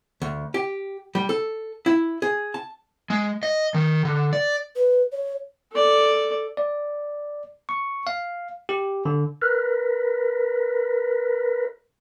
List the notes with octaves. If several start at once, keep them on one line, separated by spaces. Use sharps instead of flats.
D2
G4
G3
A4
E4
G#4
A5
G#3
D#5
D#3
D3
D5
B4
C#5
A4 D5
D5
C#6
F5
G4
D3
A#4 B4